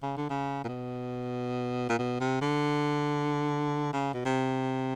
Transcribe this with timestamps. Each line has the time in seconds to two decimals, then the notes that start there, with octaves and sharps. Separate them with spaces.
0.03 C#3
0.17 D3
0.30 C#3
0.64 A#2
0.68 B2
1.89 A#2
1.99 B2
2.20 C3
2.41 D3
3.93 C#3
4.14 B2
4.25 C3